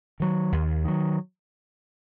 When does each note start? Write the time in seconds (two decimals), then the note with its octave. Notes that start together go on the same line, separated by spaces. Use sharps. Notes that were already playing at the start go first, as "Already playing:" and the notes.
0.20 D#3 F#3
0.52 D#2
0.84 D#3 F#3